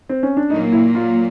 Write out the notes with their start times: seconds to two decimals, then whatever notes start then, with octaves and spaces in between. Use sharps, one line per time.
0.09 C4
0.23 C#4
0.37 D4
0.50 A#2 F#3 A#3 D#4
0.72 E4
0.95 F4